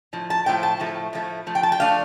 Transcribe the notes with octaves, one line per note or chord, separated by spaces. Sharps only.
A2 F3
A5
A2 F3 A3 G5
A5
A2 F3 A3
A2 F3 A3
F3 A3
G5
A5
G5
F3 A3 D4 F5